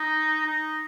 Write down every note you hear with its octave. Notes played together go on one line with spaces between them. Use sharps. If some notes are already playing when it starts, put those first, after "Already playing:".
Already playing: D#4
D#4